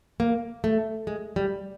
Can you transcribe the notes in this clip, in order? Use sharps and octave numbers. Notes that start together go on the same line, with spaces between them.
A#3
A3
G#3
G3